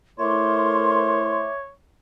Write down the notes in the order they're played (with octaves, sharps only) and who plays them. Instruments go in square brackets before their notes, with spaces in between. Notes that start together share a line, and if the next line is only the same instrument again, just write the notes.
[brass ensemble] A3 E4 C5 [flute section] A#4 C6 [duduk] C#5 [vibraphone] E5 D6